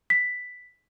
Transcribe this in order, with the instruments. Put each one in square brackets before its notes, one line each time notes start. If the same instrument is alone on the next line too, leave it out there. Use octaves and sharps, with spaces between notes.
[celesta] B6